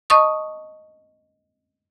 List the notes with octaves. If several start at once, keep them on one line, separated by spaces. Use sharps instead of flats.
D#5 A5 C#6 D#6